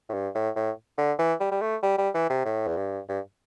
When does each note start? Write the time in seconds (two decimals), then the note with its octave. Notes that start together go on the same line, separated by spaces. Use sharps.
0.09 A2
0.14 G2
0.35 A2
0.56 A2
0.98 D3
1.19 E3
1.40 G3
1.51 G3
1.61 A3
1.83 G3
1.98 G3
2.14 E3
2.30 C3
2.45 A2
2.67 E2
2.77 G2
3.09 G2